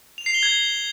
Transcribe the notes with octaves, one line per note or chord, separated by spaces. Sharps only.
F7
C7
G7
G#6